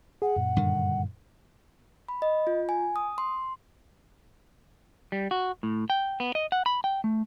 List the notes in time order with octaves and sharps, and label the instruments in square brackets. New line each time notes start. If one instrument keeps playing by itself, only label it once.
[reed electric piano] G#4 [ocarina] F#5
[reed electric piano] F#2 A#2
[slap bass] G2 D3 D#3
[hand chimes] B5
D#5
F4
G#5
D#6
C6
[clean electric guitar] G3
F#4
A2
G5
B3
D#5
F#5
B5
G5
A3